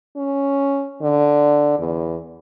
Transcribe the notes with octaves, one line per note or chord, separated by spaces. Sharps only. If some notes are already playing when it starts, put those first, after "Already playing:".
C#4
D3
E2